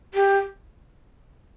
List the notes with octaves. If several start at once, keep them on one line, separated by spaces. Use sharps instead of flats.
G4